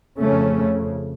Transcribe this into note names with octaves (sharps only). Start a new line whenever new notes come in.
F2 C#3 A3 C#4